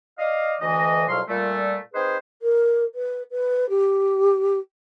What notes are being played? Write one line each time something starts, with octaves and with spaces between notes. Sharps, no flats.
D5 D#5 F5
D2 E3 D#5
C2 F2 B2 F#3 F5 C6
A#2 G3 A3
C4 D#4 G#4 B4 C5
A#4
B4
B4
G4